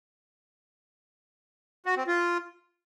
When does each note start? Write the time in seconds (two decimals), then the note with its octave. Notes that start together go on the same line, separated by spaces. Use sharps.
1.86 F#4
1.97 C4
2.07 F4